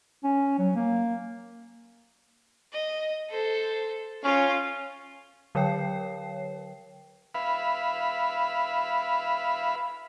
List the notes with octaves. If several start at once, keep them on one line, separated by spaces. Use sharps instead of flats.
C#4
F#3
A#3
D#5
A4 C5
C#4 F4 F5
D3 F#3 A#4 C#5 G5 C7
B4 E5 F5 B5